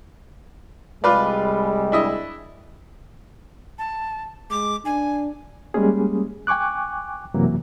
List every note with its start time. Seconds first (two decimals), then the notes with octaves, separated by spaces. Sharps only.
1.04 C2 G3 G#3 F4 B4 D5
1.92 D4 E4 D#5
3.79 A5
4.50 G#3 D6
4.85 D4 G#5
5.74 G3 G#3 A#3 C#4 G#4
6.47 G5 G#5 C#6 D6 F#6
7.34 F#2 C3 E3 F#3 A#3